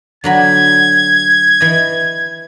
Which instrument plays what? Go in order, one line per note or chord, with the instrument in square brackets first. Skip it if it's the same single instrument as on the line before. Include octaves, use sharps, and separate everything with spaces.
[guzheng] D3 F#3 B5 [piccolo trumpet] G#6
[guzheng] E3 D#5